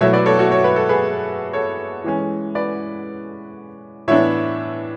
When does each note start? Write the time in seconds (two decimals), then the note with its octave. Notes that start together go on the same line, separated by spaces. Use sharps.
0.01 B2 F#3 A3 E4 C#5 E5
0.13 B4 D5
0.26 A4 C#5
0.39 F#4 A4
0.51 C#5
0.64 B4
0.76 A4
0.89 G#4 B4
1.53 A4 C#5
2.04 E3 G#3 C#4
2.55 B4 D5
4.08 A2 E3 B3 D4 C#5 E5